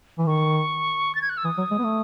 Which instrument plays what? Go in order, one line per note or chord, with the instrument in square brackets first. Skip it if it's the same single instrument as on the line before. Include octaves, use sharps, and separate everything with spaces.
[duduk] E3
[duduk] D#3 [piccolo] C#6
[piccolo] A6
G#6
F#6
E6
[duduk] E3 [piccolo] D#6
[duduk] F#3
G#3
B3
A3